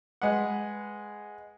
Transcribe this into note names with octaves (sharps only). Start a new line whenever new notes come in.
G#3 B4 F#5